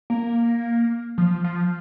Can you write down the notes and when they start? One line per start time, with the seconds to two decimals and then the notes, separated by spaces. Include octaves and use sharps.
0.10 A#3
1.18 F3
1.44 F3